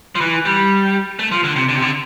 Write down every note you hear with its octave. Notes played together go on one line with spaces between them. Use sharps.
F3
E3
G3
A3
F3
D3
C3
D3
C3
D3